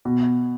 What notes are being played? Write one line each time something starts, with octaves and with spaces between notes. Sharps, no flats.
B2